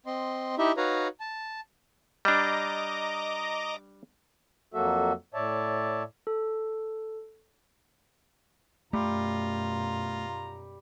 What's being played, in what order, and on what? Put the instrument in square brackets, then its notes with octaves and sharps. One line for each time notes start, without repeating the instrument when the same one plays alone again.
[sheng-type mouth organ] C4 D#5 C6
D#4 E4 G4 D#5 E5
D#4 F#4 B4 C#5 F5 A#5
A5
[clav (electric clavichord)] G3 D4 [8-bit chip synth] D#5 A#5 D6
[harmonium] F2 F#3 A#3 F#4 A4 E5
A2 C#5 D5 E5 A5
[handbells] A4
[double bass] F#2 B2 [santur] G3 [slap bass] A3 [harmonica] F4 A#5